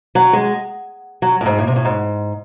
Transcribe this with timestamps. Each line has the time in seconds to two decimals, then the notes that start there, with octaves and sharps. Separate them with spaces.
0.15 F#3
0.33 G#3
1.22 F#3
1.41 A2
1.46 G#2
1.59 A2
1.67 C3
1.76 A2
1.85 G#2